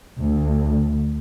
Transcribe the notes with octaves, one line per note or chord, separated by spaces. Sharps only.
D2